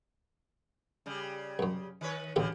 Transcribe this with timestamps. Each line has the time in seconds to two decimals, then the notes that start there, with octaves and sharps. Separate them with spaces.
1.06 C#3 G3
1.59 C2 F#2
2.01 D#3 B4 C#5
2.36 A1 D2 C#3 G3 G4